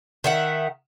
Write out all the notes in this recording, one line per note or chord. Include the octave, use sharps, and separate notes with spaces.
D#3 E5 F#5